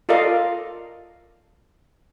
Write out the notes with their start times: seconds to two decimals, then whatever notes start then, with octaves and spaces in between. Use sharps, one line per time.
0.09 F4 A4 A#4 D5 D#5 F5